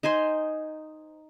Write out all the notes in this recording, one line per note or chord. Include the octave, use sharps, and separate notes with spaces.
D#4 C5 G#5 C6